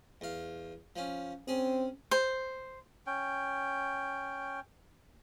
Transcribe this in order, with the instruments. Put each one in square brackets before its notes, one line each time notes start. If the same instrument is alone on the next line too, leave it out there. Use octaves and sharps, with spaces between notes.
[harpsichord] E2 F5
F3 C#4
[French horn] C4 [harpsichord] C#4 G#4
[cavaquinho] C5
[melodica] C#4 G5